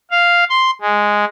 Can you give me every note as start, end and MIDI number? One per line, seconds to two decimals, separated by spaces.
0.11 0.44 77
0.50 0.71 84
0.81 1.25 56